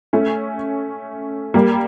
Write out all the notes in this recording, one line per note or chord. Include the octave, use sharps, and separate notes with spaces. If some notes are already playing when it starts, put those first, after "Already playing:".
A3 C#4
G3 A#3